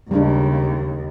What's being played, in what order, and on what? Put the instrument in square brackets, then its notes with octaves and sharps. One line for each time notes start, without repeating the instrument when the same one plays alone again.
[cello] D#2 [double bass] C#3 [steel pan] G3 G#3 D4